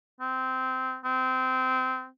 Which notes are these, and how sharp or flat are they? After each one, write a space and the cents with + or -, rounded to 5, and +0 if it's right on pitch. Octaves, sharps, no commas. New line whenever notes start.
C4 -15
C4 -20